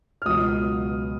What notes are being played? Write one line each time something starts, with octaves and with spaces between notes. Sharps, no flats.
F6
C#2 B2 F#3 D#6